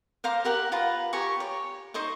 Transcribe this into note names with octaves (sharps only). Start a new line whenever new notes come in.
C5 F5 A#5 D6
G4 A#4 F#5
F4 B4 A#5
G4 G#5 A#5 C#6
C#5
D#4 C5 D#5 C#6